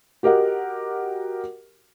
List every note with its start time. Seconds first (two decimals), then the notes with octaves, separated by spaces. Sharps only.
0.23 F#4 G4 A#4 D#5 F#5